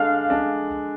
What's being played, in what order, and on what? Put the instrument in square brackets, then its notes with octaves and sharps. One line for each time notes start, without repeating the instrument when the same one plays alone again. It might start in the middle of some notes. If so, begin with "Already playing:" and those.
Already playing: [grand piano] D3 G#3 D4 [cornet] F5
[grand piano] G#3 D4